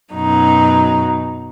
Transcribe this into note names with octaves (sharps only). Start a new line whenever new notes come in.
F#2 B2 F#3 D#4